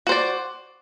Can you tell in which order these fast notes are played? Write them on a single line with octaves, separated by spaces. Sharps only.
F#4 C5 D5